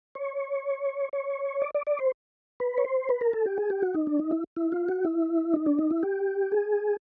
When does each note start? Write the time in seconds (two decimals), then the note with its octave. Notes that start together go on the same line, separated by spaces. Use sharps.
0.15 C#5
1.13 C#5
1.62 D5
1.75 D5
1.87 D5
1.99 C5
2.60 B4
2.78 C#5
2.85 C5
3.09 B4
3.21 A#4
3.33 A4
3.46 G4
3.58 G#4
3.70 G4
3.82 F#4
3.94 D#4
4.07 D4
4.19 D#4
4.31 E4
4.56 E4
4.72 F4
4.89 F#4
5.05 E4
5.54 D#4
5.66 D4
5.79 D#4
5.91 E4
6.03 G4
6.52 G#4